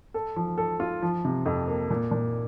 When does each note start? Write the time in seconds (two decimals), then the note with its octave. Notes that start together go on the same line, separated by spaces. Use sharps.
0.14 A4
0.36 F3
0.58 A4
0.80 F4
1.02 F3
1.25 C3
1.46 F2
1.68 A#3
1.90 A#2
2.11 A#2